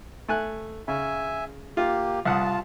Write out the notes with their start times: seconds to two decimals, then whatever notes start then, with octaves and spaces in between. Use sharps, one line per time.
0.28 A3 G#5 F#6
0.88 C#3 E5 G#5
1.77 A#3 F4 G4
2.25 C2 F4 F#5 A5 D#6